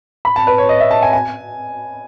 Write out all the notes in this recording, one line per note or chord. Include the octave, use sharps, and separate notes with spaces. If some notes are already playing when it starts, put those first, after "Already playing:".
B5
A5
B4
C#5
D#5
E5
A5
G#5
G#5